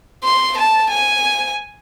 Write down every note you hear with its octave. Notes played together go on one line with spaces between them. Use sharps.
C6
A5
G#5